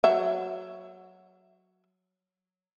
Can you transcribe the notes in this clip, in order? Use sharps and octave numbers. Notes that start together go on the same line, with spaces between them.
F#3 E5